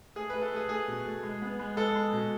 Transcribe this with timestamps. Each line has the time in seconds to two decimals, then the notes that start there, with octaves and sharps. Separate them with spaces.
0.16 A3 G#4
0.30 A3 B4
0.42 A4
0.52 A3 G#4
0.69 A3 G#4
0.88 B2
1.06 A3
1.23 G#3
1.42 B3
1.59 G#3
1.77 G#3 A4
1.96 G#3
2.13 B2